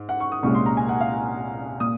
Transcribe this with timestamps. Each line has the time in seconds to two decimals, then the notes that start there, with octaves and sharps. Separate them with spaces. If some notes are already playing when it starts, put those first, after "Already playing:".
Already playing: G#2
0.09 F#5
0.20 C#6
0.32 D#6
0.43 C2 A#2 G#3 C#4 C#6
0.55 C6
0.66 A#5
0.77 G#5
0.89 F#5
1.00 F5
1.80 A#2 D#6